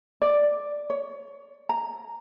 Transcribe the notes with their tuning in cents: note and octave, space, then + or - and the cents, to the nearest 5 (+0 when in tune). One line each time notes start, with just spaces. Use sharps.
D5 +5
C#5 +20
A#5 -5